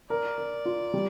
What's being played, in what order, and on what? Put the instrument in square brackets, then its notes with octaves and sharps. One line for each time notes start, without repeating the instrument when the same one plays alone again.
[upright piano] A#4 [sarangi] D5
[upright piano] A#4
F4
G3